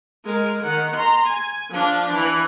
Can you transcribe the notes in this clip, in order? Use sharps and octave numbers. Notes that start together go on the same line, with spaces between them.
G#3 A#4
D#3 F#5
A#5 C6
G#5
F3 D4
E3